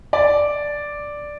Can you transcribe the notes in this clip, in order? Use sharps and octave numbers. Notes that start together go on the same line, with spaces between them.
D5